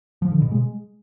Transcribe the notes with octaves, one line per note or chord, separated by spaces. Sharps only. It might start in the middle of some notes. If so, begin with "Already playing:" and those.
F3
D3
B2
G#3